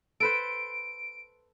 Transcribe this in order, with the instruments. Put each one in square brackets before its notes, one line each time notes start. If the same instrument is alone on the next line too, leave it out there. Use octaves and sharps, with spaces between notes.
[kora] A4 B4 C5 [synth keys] D7